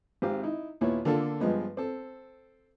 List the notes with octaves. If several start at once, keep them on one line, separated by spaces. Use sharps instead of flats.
G#1 C4 G4 F5
D#4 E4
D#2 A#2 B3 E4 C#5
D3 A#3 D4 F4 A4
G2 F3 G#3 B3
C4 A4